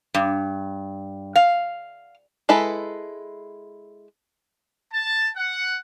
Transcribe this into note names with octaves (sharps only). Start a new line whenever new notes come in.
G2
F5
G#3 E4 A4 B4
A5
F#5